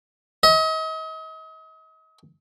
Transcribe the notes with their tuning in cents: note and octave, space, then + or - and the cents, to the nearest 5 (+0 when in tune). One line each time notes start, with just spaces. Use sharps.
D#5 +40